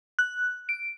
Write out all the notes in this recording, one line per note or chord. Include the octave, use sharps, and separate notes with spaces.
F#6
D7